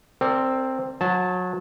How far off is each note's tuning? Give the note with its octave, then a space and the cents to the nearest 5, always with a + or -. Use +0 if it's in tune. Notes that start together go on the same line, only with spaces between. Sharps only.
C4 +5 A#4 -40 D5 +0
F#3 -30 A5 -10